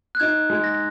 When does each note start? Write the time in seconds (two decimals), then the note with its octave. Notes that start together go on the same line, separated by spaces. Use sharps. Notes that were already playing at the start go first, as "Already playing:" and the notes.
0.15 F#6
0.20 D#4 G#6
0.50 G#3
0.55 G#6
0.64 A#6